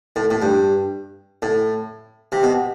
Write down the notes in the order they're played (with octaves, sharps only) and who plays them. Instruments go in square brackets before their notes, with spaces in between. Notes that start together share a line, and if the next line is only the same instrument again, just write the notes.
[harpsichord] A2
A2
G2
A2
C3
B2